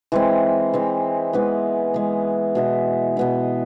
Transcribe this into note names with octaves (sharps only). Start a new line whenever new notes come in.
E3 G#3 C4
E3 G#3 C4
E3 G#3 B3
E3 G#3 B3
B2 B3 E4
B2 B3 E4